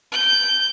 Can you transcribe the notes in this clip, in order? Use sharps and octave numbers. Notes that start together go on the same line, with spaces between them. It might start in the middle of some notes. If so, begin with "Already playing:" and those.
G6